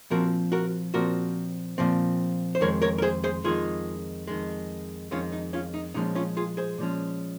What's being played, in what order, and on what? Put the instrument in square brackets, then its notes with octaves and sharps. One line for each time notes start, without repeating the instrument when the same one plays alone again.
[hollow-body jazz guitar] A#2 F3 C4 F#4 A#4
F#4 A#4
A#2 F3 C4 F#4 A#4
A#2 F3 C4
C5
F2 D#3 G#3 A#4 C#5
A#4 C#5
A#4
G#4 C5
G#4 C5
F2 D#3 G#3 F4 G#4
F2 D#3 G#3
F2 D#3 G#3 C#4 F4
D#4
C#4 F4
D#4
A#2 F3 G#3 C#4 D#4
C#4 F4
F4 G#4
G#4 C5
A#2 F3 G#3 C#4